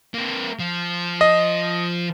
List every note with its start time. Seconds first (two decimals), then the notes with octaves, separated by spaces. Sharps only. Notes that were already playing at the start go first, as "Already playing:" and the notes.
0.14 A#3 C4
0.59 F3
1.21 D#5